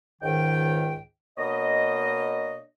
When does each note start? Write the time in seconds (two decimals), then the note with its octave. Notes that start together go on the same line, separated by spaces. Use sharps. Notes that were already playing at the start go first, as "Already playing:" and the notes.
0.22 C#2 G#2 D#3 G5
1.38 B2 A#3 D4 C#5 D#5